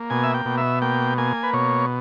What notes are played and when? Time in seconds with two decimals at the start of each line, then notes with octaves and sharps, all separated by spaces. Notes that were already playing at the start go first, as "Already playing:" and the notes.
Already playing: A#3
0.10 B2 G#5
0.24 E5
0.34 G5
0.46 B2
0.58 E5
0.82 A#3 G5
1.18 A#3 G#5
1.43 B4
1.53 B2 C#5